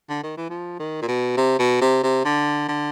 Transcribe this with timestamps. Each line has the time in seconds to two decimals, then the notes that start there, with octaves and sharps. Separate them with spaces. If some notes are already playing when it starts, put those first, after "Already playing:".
0.10 D3
0.23 D#3
0.37 E3
0.50 F3
0.79 D#3
1.02 A#2
1.08 B2
1.37 C3
1.59 B2
1.81 C3
2.03 C3
2.25 D3
2.68 D3